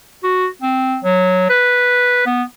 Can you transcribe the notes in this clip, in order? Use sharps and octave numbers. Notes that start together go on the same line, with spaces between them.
F#4
C4
F#3
B4
B3